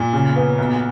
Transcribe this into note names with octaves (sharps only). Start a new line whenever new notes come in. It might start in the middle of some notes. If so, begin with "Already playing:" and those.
Already playing: A#2
C#3
B3
B1